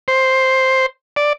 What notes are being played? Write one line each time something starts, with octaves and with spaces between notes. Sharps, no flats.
C5
D5